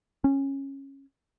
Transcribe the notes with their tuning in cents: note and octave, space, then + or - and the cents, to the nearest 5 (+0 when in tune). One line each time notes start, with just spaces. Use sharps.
C#4 -15